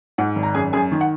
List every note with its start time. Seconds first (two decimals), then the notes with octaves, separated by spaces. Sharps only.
0.18 G#2 F#5
0.36 G#1
0.43 A#5
0.54 F#2 G#4 G#5
0.73 F#2 G#4 G#5
0.92 D#3
1.01 F#5